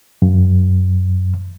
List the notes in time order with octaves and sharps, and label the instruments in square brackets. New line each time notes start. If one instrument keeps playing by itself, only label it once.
[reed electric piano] F#2